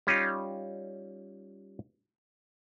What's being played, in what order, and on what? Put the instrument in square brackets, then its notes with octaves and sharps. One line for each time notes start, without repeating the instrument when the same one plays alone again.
[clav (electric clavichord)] G3 C#4 D#4 F4